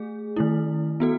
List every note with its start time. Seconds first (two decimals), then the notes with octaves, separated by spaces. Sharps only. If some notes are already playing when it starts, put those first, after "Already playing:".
Already playing: A3 G#4
0.36 D#3 A3 E4
1.00 B3 F#4 A4